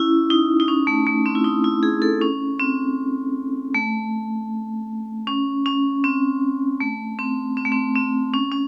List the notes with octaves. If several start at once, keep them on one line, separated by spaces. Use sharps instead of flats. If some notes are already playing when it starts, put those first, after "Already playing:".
Already playing: C#4 E4
D#4
D#4
C#4
A3
A3
C4
E4
D#4
E4
G#4
A4
C#4
C4
A3
C#4
C#4
C4
A3
C4
C4
A3
C4
C4
C#4
C#4